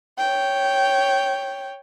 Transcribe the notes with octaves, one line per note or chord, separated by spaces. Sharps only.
C#5 G5